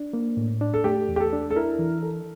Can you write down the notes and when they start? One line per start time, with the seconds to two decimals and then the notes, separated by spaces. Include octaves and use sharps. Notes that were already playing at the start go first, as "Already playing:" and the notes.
Already playing: D4
0.13 A#3
0.37 A2
0.61 D4
0.74 A4
0.84 A3 G4
1.09 E2
1.16 G4
1.20 A4
1.33 D4
1.51 A4
1.56 E4 A#4
1.79 E3
2.03 A4